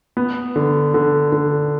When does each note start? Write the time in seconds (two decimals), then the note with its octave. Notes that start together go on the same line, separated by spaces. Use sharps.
0.17 B3
0.56 D3
0.94 D3
1.32 D3